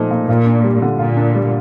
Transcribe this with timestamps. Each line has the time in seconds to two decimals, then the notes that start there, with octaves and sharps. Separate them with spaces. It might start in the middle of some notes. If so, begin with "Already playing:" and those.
Already playing: A#2 F3 A3 D#4
0.11 A#2
0.29 A#2 F4
0.46 D4
0.64 G3
0.82 D3
0.99 A#2 F4
1.17 D4
1.35 G3